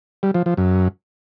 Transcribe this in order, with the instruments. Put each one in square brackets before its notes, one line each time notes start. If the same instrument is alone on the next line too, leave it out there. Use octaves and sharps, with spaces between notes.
[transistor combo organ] G3
F3
F3
F#2